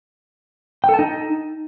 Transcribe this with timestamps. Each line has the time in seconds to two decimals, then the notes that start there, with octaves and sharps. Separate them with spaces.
0.84 G5
0.89 A4
0.94 A5
0.99 D#4